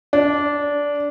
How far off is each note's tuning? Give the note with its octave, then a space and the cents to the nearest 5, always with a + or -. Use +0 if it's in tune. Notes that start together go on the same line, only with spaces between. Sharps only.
D4 -15